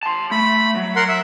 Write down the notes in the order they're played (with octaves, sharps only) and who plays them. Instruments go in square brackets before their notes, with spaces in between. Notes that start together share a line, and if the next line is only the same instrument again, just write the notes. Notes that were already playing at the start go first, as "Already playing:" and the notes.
[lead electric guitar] A5 C6
[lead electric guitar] A3 [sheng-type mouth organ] B5
[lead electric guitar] F#3
[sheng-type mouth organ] A#4 F#5 C6
E5